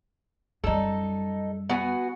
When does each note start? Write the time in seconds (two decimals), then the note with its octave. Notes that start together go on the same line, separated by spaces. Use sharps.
0.64 F#2 G3 D#4 A4
1.70 B3 F#4 G#5